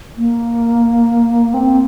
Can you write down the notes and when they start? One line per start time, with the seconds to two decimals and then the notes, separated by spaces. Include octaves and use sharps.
0.17 A#3
1.54 C4